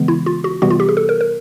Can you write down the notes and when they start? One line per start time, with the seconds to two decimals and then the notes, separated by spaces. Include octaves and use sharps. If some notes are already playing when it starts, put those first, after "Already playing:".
Already playing: C#3 E3 G#3 B3
0.08 E4
0.26 F4
0.44 F#4
0.62 C3 E3 G3 B3 F#4
0.70 F4
0.80 G4
0.89 G#4
0.97 A4
1.09 A#4
1.21 A#4